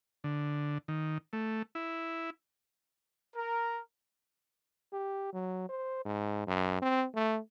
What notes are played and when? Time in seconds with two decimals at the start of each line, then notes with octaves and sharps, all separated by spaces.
0.24 D3
0.88 D#3
1.33 A3
1.75 E4
3.36 A#4
4.93 G4
5.33 F#3
5.69 C5
6.05 G#2
6.47 F#2
6.82 C4
7.15 A3